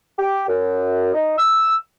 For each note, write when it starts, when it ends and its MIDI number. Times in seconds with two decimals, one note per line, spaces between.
0.19 0.46 67
0.48 1.13 42
1.14 1.37 63
1.38 1.75 88